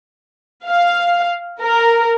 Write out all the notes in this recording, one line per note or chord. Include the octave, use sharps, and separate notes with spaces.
F5
A#4